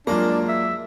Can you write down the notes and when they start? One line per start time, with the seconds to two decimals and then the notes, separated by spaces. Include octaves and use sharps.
0.07 F#2 G#3 A#3 D4 F4 D#5
0.49 E5